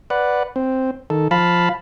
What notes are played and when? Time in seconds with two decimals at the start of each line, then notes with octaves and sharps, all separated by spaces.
0.10 B4 D5 F#5
0.56 C4
1.10 D#3 A4
1.31 F3 F5 A5 B5